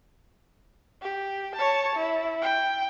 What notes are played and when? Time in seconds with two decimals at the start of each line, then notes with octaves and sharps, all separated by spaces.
1.02 G4
1.55 C#5 A5
1.96 E4
2.42 G5